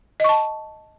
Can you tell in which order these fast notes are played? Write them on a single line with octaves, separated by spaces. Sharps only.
D#5 C#6 A5